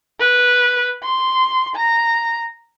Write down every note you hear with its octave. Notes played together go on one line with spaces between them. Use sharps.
B4
C6
A#5